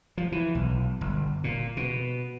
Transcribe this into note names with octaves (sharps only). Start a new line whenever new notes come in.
F3
E3
B1
G1
A#2
B2